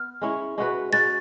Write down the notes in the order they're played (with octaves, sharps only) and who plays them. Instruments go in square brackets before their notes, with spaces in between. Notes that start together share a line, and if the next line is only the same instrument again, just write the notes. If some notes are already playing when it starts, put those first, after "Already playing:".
Already playing: [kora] B3 [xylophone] F6
[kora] G#3 C#4 E4
G#3 C#4 F#4 B4
[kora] G#3 C#4 F#4 B4 [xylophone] A6